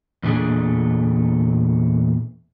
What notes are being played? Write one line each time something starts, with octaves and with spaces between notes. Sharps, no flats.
E2 A#2 A3 D4 G#4